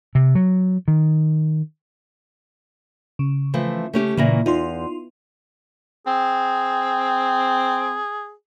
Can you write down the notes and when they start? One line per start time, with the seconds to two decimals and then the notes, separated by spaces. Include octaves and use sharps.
0.15 C3
0.35 F#3
0.88 D#3
3.19 C#3
3.54 E3 F3 A3
3.94 A3 C#4 G4
4.17 A#2 C#3 E3 A#3 A#6
4.46 E2 D#4 F4 C6
6.07 C4 G#4